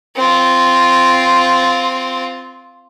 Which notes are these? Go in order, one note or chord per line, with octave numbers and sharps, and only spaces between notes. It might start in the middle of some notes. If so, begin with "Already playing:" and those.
C4 F4